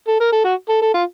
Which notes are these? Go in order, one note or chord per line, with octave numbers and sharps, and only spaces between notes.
A4
A#4
A4
F#4
A4
A4
F4